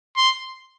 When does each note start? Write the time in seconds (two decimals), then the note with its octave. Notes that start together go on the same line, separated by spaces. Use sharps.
0.16 C6